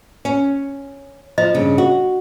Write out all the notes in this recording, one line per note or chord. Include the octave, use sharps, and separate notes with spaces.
C#4
F3 D#5
G2 C#3
F#4